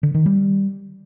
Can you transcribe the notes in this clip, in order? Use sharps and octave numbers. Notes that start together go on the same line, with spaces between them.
D3
D#3
G3